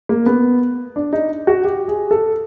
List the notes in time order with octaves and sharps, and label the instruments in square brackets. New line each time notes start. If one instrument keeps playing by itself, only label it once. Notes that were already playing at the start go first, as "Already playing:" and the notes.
[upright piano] A#3
B3
D4
D#4
F#4
G4
G#4
A4